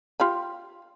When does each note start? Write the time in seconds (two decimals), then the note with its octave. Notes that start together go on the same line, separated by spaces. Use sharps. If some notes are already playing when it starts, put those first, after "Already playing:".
0.20 F4 G4 B5